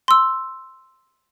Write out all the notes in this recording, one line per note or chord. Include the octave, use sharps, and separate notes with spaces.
C6 E6